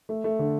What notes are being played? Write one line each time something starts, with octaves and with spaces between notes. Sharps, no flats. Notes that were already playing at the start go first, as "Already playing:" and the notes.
A3
A3
D3